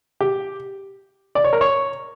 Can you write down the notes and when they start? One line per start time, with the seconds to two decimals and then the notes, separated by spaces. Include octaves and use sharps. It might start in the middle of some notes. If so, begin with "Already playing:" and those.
0.21 G4
1.35 D5
1.44 C#5
1.53 A#4
1.61 C#5